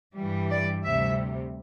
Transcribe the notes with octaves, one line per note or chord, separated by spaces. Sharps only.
G2 E3 G3
D5
D2 C3 G3 E5